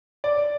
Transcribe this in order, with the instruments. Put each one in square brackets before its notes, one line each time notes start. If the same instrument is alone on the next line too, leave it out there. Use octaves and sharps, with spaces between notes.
[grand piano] D5